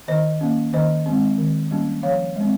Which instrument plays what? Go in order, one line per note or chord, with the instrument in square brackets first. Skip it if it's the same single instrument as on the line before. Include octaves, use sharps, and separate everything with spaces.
[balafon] D#3 C5 D#5
A#3 C#4
D#3 C5 D#5
G#3 C4
D#3
G3 A#3 C#4
F3 C#5 F5
G#3 C4